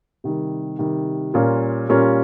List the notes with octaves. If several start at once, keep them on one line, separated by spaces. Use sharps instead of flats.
C3 D#3 G3
C3 D#3 G3
A#2 G3 C#4 F4 A#4
A#2 G3 C#4 F4 A#4